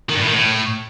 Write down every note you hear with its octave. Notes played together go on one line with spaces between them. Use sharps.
D#3
G2
A2
D#3
A2